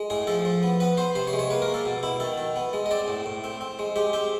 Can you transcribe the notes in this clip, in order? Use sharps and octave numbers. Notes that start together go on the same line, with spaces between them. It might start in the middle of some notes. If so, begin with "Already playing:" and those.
Already playing: G#3
A2 G#4
F3 A4
F3
B3
B3 B4
B3 C5
C3 C5
C#5
G#3
C#5
A#3 B4
A#4
A#3
A4
B2
B2 E4
D#3 A4
D#3
B3
G#3
D#5
C4 D5
A2
A2
C4
C4
G#3
G#3 G4
C4 G4